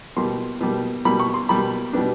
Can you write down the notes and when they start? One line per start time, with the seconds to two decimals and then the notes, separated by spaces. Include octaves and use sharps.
0.17 B2 G3 A#3 C6
0.61 B2 G3 A#3
1.05 B2 G3 A#3 B5
1.20 C#6
1.34 C6
1.49 B2 G3 A#3 B5
1.93 B2 G3 B3 D4